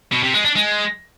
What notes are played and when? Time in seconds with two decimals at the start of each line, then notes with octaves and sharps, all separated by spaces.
0.12 B2
0.23 C3
0.34 G#3
0.45 D4
0.56 G#3